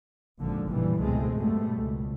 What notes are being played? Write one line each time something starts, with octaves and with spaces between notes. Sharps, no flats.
G#1 F2 A#2 D3 F3
F#1 B1 A#2 E3 G3
C#2 G#2 B2 G#3 A3 C4
F#2 B2 G3 A3
C#2